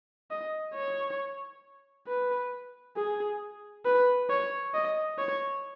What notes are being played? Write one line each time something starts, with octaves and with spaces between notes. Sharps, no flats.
D#5
C#5
B4
G#4
B4
C#5
D#5
C#5